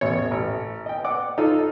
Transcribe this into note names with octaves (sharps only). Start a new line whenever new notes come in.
A1 E2 C#5
A1
D#5 G5
D5 F#5 D6
D#4 F4 A4